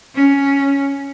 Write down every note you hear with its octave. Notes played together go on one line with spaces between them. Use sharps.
C#4